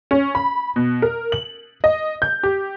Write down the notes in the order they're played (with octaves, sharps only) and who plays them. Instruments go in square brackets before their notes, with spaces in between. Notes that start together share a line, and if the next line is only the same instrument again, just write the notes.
[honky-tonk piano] C#4
B5
B2
A#4
F#7
D#5
G6
G4